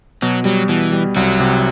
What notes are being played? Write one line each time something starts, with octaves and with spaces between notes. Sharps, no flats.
B2 F#3
F#3 G3
B2 E3
G3
C2 F#3
C3